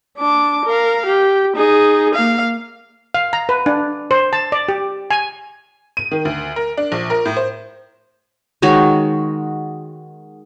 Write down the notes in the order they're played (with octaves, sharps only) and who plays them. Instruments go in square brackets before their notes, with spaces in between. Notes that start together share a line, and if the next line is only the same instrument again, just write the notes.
[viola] D4 D6
A#4 F5
G4
D#4 G#4
A#3 F5
[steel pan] F5
A#5
B4
D4
C5
A5
D5
G4
G#5
[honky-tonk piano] D#7
D#3
D2
A#4
D4
A#1
A#4
A2
C5
[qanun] D#3 G#3 F#4 C#5